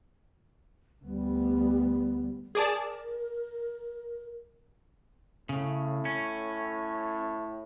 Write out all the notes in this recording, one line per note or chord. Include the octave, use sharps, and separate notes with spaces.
D2 G3 B3
G#4 A#4 D5 A5
A2 C#3
C#4